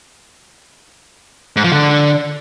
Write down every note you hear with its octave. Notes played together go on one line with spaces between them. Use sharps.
G#2
F3
D3